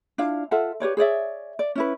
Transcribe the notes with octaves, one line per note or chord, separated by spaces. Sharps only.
D4 E4 F4 F5
F4 A4 E5 F#5
G4 B4 C#5 D5
G#4 C#5 D5 E5
D5
C#4 E4 B4